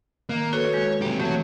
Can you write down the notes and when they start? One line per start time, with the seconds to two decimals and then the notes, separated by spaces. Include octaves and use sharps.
0.29 D#3 A#3
0.53 F#4 A4 B4 C#5
0.73 G#3 G6
1.02 B1 A#3 C4 G4
1.19 E3 A3 F#4 C#5